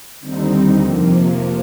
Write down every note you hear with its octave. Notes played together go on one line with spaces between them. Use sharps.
D#2 D3 G3 C4 D#4
F2 C3 F3 A#3